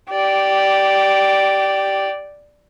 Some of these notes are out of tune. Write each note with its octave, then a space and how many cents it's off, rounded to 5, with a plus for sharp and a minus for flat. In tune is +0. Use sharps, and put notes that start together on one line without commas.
G4 -15 D5 +0